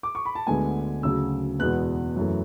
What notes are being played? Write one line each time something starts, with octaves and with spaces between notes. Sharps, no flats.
D6
C#6
B5
A5
D2 D3 G#3 B3 G#5
D2 C#3 F#3 E6
E2 B2 G#3 B3 F#6
F#2 E3 A3